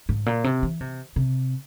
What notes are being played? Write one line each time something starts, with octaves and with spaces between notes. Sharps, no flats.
G#2
A#2
C3
E3
C3
C3